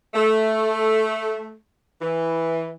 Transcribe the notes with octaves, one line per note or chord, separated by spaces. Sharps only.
A3
E3